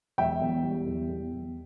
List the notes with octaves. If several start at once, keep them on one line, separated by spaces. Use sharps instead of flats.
E1 E5 G5
E2
G3
E2
E2
E2